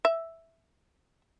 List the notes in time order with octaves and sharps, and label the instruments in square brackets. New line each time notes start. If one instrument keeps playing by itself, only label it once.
[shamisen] E5